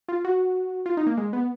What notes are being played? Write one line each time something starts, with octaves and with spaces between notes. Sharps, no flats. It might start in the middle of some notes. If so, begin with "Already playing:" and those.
F4
F#4
F4
D#4
A#3
G#3
B3